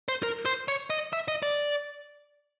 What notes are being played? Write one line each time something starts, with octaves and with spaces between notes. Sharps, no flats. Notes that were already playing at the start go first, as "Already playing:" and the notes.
C5
A#4
C5
C#5
D#5
E5
D#5
D5